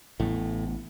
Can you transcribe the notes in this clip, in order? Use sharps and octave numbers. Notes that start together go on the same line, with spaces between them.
A1 A2 B3